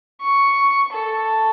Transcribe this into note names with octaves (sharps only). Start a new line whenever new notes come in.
C#6
A4